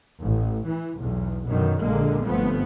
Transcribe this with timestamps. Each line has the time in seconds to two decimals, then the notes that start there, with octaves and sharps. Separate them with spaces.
0.20 A1
0.68 E3
1.01 B1 E2
1.48 F#2 B2 D3 D#3
1.81 A#1 A#2 D3 G#3 A#3
2.26 G1 F3 A3 B3 C4